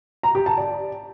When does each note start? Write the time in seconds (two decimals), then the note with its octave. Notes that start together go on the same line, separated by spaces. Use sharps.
0.23 A#5
0.35 G4
0.46 A5
0.58 D5